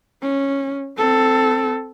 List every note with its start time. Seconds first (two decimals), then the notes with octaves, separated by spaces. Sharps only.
0.22 C#4
0.97 C4 A4